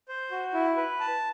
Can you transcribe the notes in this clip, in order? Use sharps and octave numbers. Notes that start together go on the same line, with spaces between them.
C5
F#4
E4
B4
A5